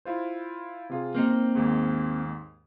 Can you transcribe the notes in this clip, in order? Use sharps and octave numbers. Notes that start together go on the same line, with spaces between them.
E4 F4 C5
C3 F4 G#4
A#3 C4 D#4 C5
D#2 G#2